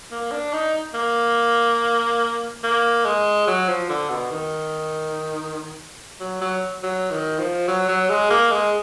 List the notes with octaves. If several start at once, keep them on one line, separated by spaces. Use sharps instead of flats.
A#3
D4
D#4
A#3
A#3
G#3
F#3
F3
D3
B2
D#3
F#3
F#3
F#3
D#3
F3
F#3
F#3
G#3
A#3
G#3